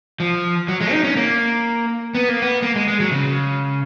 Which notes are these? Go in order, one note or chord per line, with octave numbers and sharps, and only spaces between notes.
F3
F#3
G#3
D#4
C#4
A#3
B3
A#3
B3
A#3
G#3
G#3
F#3
C#3